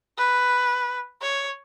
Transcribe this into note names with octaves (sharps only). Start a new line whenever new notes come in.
B4
C#5